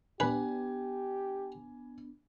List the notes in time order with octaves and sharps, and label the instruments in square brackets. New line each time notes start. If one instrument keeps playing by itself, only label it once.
[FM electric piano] B3 D4 [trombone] G4 [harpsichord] B4 [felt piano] G#5